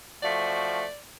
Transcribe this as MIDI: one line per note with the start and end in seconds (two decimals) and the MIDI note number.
0.22 0.83 53
0.22 0.83 57
0.22 0.83 66
0.22 0.98 74